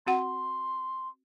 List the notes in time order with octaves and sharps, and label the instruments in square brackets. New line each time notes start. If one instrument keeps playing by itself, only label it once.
[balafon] C4 F#4 F#5 [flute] C6